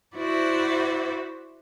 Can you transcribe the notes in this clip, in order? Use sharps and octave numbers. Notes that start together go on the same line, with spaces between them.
E4 F#4 C5 D5 E5